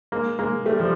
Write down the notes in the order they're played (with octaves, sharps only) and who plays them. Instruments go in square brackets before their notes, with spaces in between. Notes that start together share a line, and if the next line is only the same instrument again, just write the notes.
[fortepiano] G#3 A#3
G#3 A#3
G3 A3
F3 G3